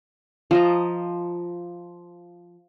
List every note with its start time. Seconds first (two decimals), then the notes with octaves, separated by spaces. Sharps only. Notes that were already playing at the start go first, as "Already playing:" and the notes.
0.51 F3 D#5 A#5